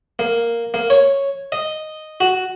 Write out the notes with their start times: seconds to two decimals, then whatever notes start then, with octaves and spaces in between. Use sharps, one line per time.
0.19 A#3
0.74 A#3
0.90 C#5
1.52 D#5
2.20 F#4